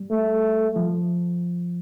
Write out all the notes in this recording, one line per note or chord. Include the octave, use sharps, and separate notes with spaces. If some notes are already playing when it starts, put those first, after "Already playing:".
Already playing: G3
A3
F3